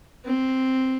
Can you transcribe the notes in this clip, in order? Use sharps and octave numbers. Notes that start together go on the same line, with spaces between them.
C4